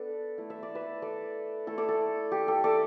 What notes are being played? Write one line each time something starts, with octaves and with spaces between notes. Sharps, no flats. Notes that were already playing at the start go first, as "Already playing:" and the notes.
Already playing: B3 D4 A4 B4 D5
A3 E4
E5
D5
B4 E5
A4 D5
A3 E4 A4
A4 D5
A4
G4
A4
A4 D5